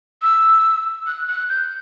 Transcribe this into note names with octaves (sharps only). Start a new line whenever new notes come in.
E6
F#6
F#6
G6